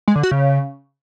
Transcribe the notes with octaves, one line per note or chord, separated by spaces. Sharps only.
G#3
D3
F#4
C#3